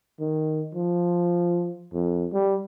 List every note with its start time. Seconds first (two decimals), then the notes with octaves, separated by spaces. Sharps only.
0.20 D#3
0.75 F3
1.93 F2
2.33 G3